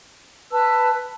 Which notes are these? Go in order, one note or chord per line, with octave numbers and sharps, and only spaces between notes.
B4 A5 E6